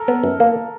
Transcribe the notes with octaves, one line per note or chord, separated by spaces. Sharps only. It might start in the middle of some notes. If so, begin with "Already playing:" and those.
Already playing: A4 A#4
B3
F#2
A#3